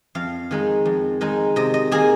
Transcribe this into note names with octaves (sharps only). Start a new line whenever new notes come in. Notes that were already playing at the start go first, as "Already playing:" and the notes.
F2 F5
D#3 G#3 D#4
F2
D#3 G#3 D#4
C3 D#5
D#5
D#3 A#3 G#4